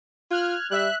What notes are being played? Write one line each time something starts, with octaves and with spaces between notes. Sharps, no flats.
F4 F6 F#6 G#6
G3 E5 F#6